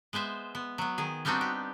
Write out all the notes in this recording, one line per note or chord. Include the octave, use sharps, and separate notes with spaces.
G#3 B3 C5 E5
B3
F#3 B3
D#3 G#4
G3 B3 C4 D4 D#4 F#4
G4